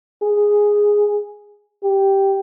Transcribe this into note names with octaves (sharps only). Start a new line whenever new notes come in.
G#4
G4